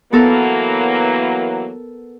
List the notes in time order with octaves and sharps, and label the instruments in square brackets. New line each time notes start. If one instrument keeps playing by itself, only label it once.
[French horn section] E3 F#3 A#3 [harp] B3 A4 A#4